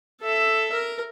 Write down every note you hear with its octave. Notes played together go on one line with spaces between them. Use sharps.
A4 E5
A#4